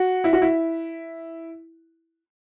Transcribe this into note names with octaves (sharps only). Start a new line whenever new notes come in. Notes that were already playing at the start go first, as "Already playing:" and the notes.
Already playing: F#4
E4
F#4
E4